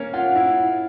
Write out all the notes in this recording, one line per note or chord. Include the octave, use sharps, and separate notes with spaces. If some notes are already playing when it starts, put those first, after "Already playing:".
Already playing: A#3 C#4
F4 F#5
E4